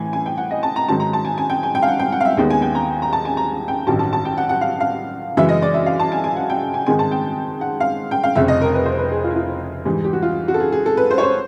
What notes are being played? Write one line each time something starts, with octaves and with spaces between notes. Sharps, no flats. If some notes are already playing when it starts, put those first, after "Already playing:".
Already playing: A2 E3 G#5
G#5
G5
F#5
D#5
A5
A#5
G#2 D#3 F#3 A5
A#5
A5
G#5
G#5
G5
G#5
G5
F5
F#5
G5
F#5
F5
E5
D#2 D#3 G#3 B3 G5
G#5
G5
A#5
A#5
A5
G#5
A#5
G5
A1 G2 D#3 F#3 A5
A5
A5
G5
F#5
F#5
F5
F5
F#2 C#3 E3 G#3 E5
D#5
D5
E5
F5
A5
G#5
G#5
F#5
G5
G#5
G#2 D#3 G#3 C4 G#5
A5
G5
F#5
F5
G5
F5
F1 F2 C#3 E5
D#5
A#4
B4
C5
B4
G#4
F4
E4
F4
G#2 E3 G3
G4
F#4
F4
F#4
A4
G#4
G#4
A4
B4
C5
C#5
C5